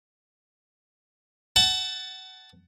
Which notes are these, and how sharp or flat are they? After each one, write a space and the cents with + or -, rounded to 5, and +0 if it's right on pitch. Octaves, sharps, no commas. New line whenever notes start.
F#5 +25 A5 +0